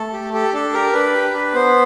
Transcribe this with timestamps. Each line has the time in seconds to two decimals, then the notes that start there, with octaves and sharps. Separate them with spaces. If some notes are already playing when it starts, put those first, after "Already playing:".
Already playing: A3 A4
0.13 G4
0.33 G4 A4
0.53 D4 A4
0.73 G4 A#4
0.93 D4 B4
1.14 G4
1.33 D4
1.54 B3 C5